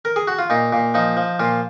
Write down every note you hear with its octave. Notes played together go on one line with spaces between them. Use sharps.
A#4
G#4
F#4
F4
A#2 D#4
A#2
F3 D#4
F3
A#2 F4